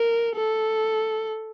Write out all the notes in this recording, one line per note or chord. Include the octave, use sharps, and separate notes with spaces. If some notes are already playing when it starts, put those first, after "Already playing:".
Already playing: A#4
A4